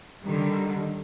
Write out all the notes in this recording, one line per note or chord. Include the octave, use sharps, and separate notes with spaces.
D3 D#3 G3